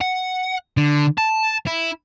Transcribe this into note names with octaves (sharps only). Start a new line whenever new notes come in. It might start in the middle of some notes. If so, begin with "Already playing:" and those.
F#5
D3
A5
E4